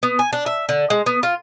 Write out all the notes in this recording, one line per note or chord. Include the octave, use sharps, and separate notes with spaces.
B3
G#5
D4
E5
D3
G#3
B3
F4